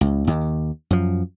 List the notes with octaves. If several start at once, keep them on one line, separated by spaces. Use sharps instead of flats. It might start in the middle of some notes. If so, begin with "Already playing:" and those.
C#2
D#2
F#2 F3